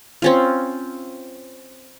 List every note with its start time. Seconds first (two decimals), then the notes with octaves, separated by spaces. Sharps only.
0.22 C4 C#4 F4